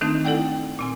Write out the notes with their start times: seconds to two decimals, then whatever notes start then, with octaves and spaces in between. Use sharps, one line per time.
0.01 D#3 E3 A3 C4 D4 D#4
0.25 E4 A4 D5 F#5 G5
0.79 A#2 C4 G#5